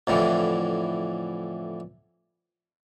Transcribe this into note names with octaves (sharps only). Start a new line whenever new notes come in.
F2 A2 D3 E3